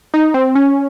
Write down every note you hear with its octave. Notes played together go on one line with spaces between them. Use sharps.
D#4
C4
C#4